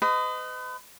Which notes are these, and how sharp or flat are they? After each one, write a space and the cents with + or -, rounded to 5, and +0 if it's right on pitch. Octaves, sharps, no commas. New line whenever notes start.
B4 +40 D#5 +0